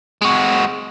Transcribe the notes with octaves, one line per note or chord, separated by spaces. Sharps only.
G#3 F#4